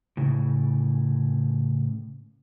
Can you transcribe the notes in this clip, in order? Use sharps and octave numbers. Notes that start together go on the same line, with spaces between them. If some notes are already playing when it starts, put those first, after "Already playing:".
A2 C#3